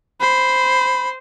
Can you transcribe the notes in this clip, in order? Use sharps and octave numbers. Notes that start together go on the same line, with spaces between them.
C5 B5